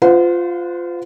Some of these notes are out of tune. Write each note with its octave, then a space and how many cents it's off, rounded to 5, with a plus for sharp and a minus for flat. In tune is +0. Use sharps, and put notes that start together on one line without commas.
F4 +0 C5 -40 F#5 -30